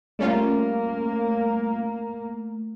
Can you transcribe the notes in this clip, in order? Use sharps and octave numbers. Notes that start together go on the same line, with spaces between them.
G3 A3 A#3 C#4 F4